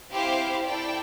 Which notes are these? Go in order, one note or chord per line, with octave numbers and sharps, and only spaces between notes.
C4 E4 G4 C5 F5
E4 A4 D5 G5